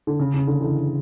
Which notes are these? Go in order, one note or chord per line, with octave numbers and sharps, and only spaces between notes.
D3
C#3
C#3
D3
D3 E3